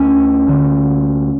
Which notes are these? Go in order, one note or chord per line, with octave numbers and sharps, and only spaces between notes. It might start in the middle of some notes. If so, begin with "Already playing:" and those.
Already playing: D2 D3 C#4
D2 D3